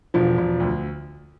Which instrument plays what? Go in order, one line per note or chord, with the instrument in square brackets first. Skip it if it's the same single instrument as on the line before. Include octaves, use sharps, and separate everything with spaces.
[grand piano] E1 [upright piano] F3
[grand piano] E1
D2